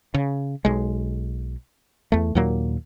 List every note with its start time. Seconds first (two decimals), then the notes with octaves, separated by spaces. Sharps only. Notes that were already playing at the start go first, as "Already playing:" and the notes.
0.14 C#3
0.65 B1 G#3
2.12 E2 A3
2.35 D#2 A#2 F#3 A#3